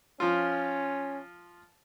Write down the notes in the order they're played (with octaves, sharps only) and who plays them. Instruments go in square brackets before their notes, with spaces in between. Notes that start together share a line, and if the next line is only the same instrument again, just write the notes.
[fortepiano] F3 F4 [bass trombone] C#4